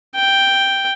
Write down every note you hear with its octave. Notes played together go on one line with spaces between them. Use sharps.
G5